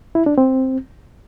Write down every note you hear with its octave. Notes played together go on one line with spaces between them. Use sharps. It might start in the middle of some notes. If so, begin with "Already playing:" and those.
E4
D4
C4